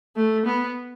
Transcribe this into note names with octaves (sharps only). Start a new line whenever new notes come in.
A3
B3